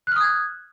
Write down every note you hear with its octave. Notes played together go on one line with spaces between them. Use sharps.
D#6 F6 F#6 G#6